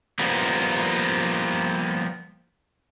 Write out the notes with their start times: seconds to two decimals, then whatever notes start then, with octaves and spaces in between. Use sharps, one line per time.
0.19 F3 G3 A#3 B3